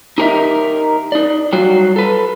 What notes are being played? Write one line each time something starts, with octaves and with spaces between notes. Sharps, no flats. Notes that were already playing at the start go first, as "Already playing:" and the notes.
D#4 G4 A#4 B4 D#5 E5
D#4 D5
F#3 G3 F4 F#4
A4 B4